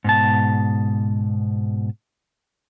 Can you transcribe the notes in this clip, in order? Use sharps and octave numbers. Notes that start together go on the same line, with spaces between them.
G#2 B2 A5